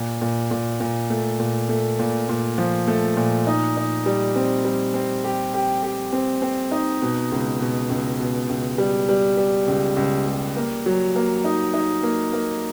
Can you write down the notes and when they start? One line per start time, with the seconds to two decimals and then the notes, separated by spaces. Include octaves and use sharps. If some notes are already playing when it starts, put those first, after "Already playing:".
Already playing: A#2
0.21 A#2
0.51 A#2
0.80 A#2
1.10 A3
1.40 A#2
1.69 A3
1.99 A#2
2.29 A#2
2.58 F3
2.88 A3
3.17 A#2
3.47 D#4
3.77 D#4
4.06 G3
4.36 C4
4.65 G3
4.94 C4
5.24 G4
5.54 G4
5.83 G4
6.13 C4
6.42 C4
6.71 D#4
7.02 B2
7.31 C#2
7.60 B2
7.90 C#2
8.20 B2
8.49 C#2
8.78 G3
9.09 G3
9.37 G3
9.67 C#2
9.96 C#2
10.26 G3
10.57 A#3
10.86 F#3
11.16 A#3
11.45 D#4
11.74 D#4
12.03 A#3
12.33 A#3